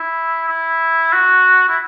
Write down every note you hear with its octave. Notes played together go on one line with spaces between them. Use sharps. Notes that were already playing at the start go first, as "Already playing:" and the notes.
Already playing: E4
E4
F#4
E4